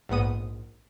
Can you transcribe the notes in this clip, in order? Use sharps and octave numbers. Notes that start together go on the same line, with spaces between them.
A#1 G#2 B3 D#6 D#7